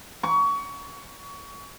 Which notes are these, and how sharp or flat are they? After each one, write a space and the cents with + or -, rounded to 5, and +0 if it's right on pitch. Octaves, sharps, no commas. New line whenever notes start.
C#6 +25